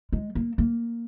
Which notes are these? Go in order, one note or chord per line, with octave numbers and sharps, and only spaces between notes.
G#3
A#3
A#3